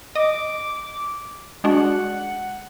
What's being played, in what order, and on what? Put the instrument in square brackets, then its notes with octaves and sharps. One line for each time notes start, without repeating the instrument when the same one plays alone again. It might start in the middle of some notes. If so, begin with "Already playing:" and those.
[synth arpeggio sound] D#5 [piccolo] D6
[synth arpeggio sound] G#3 D4 F#4 [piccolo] F#5